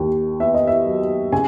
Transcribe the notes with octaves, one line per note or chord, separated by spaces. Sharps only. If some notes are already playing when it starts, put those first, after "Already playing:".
Already playing: D#2 D#3
B3 E5
D#5
E5
F#3
C#3 G#5